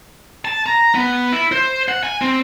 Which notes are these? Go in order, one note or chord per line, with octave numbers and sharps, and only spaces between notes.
A5
A#5
B3
E4
C5
F#5
G#5
C4